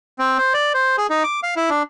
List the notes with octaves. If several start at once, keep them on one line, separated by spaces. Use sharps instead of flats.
C4
C5
D5
C5
G#4
D#4
D6
F5
E4
D4